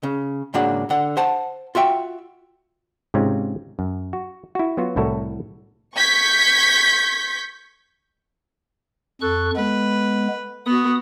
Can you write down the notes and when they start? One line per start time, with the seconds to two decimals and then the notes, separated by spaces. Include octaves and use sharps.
0.03 C#3
0.54 G#2 C#3 A#3 D4 F#4 F#5
0.90 D3 F#5
1.17 C5 F#5 A5
1.75 F4 F#4 E5 G5
3.14 G#2 C3 G#3 C4 C#4 F4
3.79 F#2
4.13 F#4
4.55 E4 F#4
4.77 F#3 B3 F4 F#4
4.96 C2 A2 E4 F#4 A4 C#5
5.96 C#6 G6 G#6 B6
9.21 F2 A4 C#6 F#6
9.56 G#3 B3 B4
10.66 B3 F#4 D#6